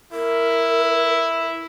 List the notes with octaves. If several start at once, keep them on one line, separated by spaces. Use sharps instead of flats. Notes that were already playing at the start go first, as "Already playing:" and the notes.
E4 A#4